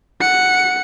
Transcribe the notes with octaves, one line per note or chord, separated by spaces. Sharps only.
F#5 C#7